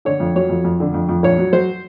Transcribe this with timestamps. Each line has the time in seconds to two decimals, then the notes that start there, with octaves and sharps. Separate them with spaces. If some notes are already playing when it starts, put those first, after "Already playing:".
0.05 D3 C#5
0.20 F2
0.35 F#3 C#5
0.49 F2
0.64 F2
0.80 D3
0.94 F2
1.09 F2
1.23 A#1 C#5
1.38 F#3
1.53 F#3 C5